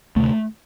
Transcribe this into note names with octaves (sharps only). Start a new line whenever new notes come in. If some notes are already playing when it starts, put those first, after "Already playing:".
D2 C3 A3